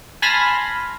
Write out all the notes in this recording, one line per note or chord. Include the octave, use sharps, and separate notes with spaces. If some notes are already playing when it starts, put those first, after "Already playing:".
G#5 A5 B5 C6 F6 A#6